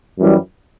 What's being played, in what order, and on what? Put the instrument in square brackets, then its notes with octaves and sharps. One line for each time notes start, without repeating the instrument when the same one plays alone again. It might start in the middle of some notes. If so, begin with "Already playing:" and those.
[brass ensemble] F#2 E3 G3